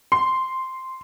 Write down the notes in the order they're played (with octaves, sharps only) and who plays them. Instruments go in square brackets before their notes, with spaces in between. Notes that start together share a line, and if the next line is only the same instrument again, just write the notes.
[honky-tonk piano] C6